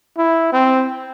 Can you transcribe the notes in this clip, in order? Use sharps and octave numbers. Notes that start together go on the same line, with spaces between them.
E4
C4